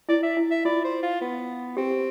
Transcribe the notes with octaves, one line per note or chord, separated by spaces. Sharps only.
E4 D5
E5
E4
E5
F4 D5
C5
F4
B3
C4 G4
G4